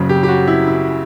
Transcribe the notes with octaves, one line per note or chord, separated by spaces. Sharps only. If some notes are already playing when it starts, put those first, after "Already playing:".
Already playing: F#1 F#2 C#3
G4
G4
F#4
E4
E4